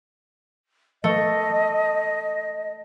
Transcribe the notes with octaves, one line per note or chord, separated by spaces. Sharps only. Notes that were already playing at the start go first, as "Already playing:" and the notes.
A3 D#5